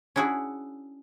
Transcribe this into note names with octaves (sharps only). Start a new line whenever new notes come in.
C#4 D4 E4 F#4 G#4